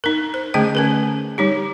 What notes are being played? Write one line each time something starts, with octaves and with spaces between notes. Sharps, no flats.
D#4 A#4
C5
D3 A3 C#4 G#4 G5
C#4 A#4 B4
G3 D#4 G4